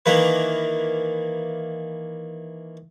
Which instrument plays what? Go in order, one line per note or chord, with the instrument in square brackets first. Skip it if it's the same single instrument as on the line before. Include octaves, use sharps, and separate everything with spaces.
[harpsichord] D#3 E3 A#3 B4